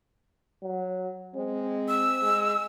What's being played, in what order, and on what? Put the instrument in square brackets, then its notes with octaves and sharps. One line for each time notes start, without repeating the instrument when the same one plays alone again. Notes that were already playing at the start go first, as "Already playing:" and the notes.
[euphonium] F#3
[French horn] G#3 [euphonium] C4
[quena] E6
[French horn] G#3